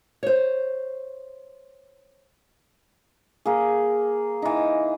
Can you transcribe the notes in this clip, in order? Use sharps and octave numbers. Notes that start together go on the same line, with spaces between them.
C5 C#5
A#3 G#4
E3 D#4